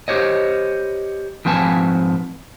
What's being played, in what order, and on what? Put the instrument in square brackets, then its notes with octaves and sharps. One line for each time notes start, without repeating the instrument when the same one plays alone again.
[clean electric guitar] G4 C5 C#5 D#5
G#2 F3 C4 B4 G#5 A5